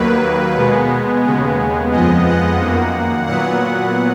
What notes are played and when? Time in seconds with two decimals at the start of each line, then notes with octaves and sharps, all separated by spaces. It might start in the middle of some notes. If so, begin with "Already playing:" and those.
Already playing: D#2 D#3 F#3 A#3 B4
0.57 B2 G#3 B3
1.24 D#2 C#3 G#3 B3
1.91 F2 F3 G#3 B3 D#5
2.25 F#5
2.59 F#2 D#3 A#3
3.26 A#2 F#3 B3 F#5